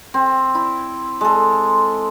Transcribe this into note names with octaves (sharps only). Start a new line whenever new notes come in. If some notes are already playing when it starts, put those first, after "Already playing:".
C4
E4
G#3 A4